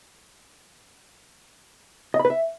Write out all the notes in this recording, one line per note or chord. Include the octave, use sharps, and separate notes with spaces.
D#5
B5
B4
E5